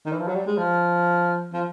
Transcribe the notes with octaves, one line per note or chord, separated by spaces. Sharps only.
D#3
E3
F3
F#3
G3
G#3
F3
F3